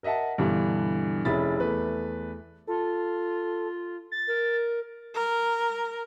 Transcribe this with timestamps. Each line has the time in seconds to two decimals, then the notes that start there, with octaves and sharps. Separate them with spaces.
0.03 A#4 D#5 E5 F#5 A5
0.38 G2 B2 D3 E3
1.25 F1 C#4 E4 G#4 B5 A6
1.60 E2 A3 B4
2.67 F4 A4
4.12 A6
4.27 A#4
5.14 A#4